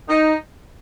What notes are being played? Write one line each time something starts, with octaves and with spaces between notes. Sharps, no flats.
D#4